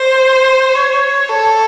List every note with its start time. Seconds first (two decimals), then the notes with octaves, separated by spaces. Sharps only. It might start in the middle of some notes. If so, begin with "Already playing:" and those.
Already playing: C5
0.75 C#5
1.29 A4